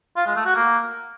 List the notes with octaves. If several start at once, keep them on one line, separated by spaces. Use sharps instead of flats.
F4
G#3
A3
F#4
A#3